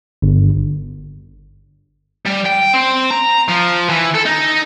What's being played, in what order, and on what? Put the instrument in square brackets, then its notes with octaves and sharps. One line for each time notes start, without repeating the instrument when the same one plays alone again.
[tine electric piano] G1
[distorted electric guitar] G3
G5
C4
A#5
F3
E3
A4
D#4